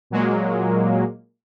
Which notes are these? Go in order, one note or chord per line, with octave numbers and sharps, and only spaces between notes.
A#2 F#3 G#3 A#3